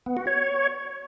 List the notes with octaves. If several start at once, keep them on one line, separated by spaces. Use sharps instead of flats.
B3
F#4
C#5